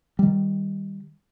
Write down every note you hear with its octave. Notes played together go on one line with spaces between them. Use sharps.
D#3 G3